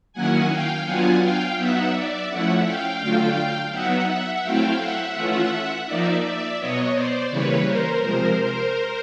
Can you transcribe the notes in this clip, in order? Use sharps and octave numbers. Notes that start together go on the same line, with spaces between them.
D#3 F#3 A#3 C#4 E4 F#5 G#5
F5 G5
F#3 B3 D4 F4 F#5 G#5
F5 G5
F#3 B3 D#4 E5 F#5
D5 E5
F3 A3 C#4 E4 E5 F#5
F5 G5
D3 F#3 A3 D4 F4
F#3 B3 D#4 E5 F#5
E5 F#5
F#3 A3 C4 E4 F5 G5
E5 F#5
E3 A3 C#4 F4
F3 A#3 D#4 D5 E5
D5 E5
B2 F#3 B3 C#5 D#5
C5 D5
C#3 E3 G3 A#3 B4 C#5
A#4 C5
C3 F3 G#3 A#4 C5
A#4 C5